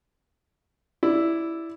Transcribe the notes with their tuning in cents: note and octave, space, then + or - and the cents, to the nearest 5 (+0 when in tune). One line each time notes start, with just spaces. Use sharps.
E4 +0 D5 +0